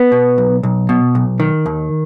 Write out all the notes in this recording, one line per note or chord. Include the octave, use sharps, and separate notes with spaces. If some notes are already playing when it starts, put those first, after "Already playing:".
Already playing: B3
B2
B1
B1
B2
B1
D#3
D#2